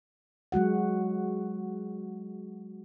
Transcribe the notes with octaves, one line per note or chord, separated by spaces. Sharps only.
F#3 G#3 F#4 F#5